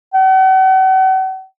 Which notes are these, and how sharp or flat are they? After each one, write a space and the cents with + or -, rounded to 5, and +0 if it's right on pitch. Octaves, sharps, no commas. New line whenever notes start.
F#5 +40